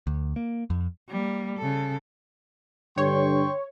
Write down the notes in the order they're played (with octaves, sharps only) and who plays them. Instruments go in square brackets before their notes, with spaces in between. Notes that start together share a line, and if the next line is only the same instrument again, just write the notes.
[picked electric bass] D2
A#3
F2
[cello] G3 A#3
C#3 A4
[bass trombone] G2 [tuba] D3 [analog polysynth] C#5 [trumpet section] G5 C6 C#6